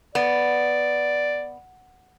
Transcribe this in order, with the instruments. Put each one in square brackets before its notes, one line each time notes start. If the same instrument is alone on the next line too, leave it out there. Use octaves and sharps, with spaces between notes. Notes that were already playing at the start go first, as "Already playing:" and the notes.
[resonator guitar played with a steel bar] B3 [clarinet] D5